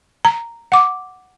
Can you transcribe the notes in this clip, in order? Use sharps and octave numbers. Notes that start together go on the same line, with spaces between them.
A#5
F#5 D6